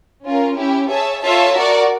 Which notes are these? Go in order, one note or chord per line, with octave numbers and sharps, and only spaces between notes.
C#4 F4 A#4
C#4 E4 G4
G#4 C#5 E5 A5
F4 A4 C#5 E5 A5
F#4 A#4 D5